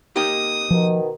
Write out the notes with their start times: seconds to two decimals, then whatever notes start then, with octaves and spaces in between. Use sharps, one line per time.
0.16 A#3 D#4 G4 D#6
0.70 B2 D#3 F3